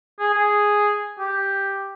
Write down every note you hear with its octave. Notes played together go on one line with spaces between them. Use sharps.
G#4
G#4
G4